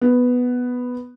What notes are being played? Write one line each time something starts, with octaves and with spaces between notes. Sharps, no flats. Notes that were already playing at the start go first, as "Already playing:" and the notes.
B3